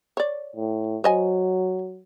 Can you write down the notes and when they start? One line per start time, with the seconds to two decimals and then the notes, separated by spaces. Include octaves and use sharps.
0.17 C#5 D5
0.56 A2
1.04 F#3 C5 D#5 G#5